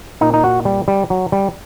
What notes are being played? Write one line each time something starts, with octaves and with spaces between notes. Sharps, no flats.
A#2 D#4
D#4
F#4
G3
G3
F#3
G3